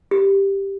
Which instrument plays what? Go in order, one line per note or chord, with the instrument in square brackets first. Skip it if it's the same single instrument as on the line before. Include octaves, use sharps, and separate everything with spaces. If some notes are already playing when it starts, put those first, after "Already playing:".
[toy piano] G4